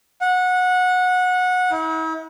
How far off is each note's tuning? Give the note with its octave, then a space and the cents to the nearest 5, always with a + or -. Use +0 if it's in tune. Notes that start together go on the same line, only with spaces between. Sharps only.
F#5 -20
E4 -45